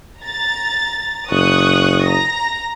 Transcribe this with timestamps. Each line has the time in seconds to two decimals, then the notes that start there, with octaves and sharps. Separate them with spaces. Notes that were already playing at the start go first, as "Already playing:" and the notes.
0.20 A#5 A6
1.31 F#1 C#6 D#6 F#6
2.04 A#5 A#6